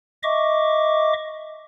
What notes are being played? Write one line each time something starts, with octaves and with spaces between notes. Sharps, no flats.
D#5 E5 C#6 D6